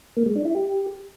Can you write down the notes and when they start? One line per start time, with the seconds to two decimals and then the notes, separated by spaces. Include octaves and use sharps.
0.17 A#3
0.26 G#3
0.36 D4
0.45 E4
0.55 G4